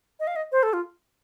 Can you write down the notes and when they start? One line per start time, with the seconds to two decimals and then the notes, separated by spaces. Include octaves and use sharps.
0.20 D#5
0.27 F5
0.36 D#5
0.52 C5
0.63 A4
0.73 F4